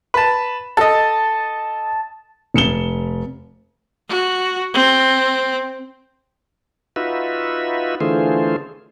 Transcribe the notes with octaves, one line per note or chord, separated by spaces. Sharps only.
B4 A5
A4 D#5 A5
F1 C#7 E7 G7
F#4
C4
D#4 F4 F#4 B4 E5
D3 E3 A3 F4 G#4 C5